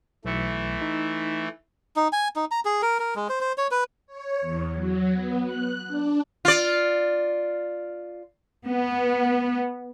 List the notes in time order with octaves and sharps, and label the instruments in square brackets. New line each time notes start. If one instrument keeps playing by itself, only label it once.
[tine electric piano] B1 C#7 [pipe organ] E3 A3
[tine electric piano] D#4
[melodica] D#4
G#5
D#4
A#5
G#4
A#4
A#4
G#3
C5
C5
C#5
B4
[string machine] C#5
E2
F#3
B3
F#6
D4
[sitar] F4 D5
[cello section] B3